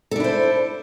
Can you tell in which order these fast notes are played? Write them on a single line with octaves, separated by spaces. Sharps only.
A4 D4 E4 C5